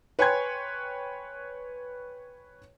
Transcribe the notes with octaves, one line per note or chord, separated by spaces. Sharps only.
B4 C#5 G5 G#5 C6 G#6